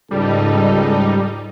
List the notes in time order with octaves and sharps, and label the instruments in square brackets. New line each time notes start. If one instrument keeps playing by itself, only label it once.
[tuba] C#2 [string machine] G#2 D#4 [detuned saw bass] G3 [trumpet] A4